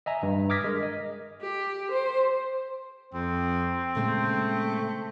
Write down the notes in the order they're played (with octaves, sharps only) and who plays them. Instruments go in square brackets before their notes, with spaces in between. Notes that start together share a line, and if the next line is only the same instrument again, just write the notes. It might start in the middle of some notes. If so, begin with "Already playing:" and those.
[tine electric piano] D#5 E5 G#5 A#5
G2
D6 D#6 F6 G#6 A#6 B6
G#3 A#4
D#5
[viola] G4
C5
[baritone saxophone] F2 [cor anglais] C4
[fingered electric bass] A#2 C#3 G#3 [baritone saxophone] A3